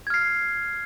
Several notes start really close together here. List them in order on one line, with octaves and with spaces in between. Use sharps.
G#6 F6 C7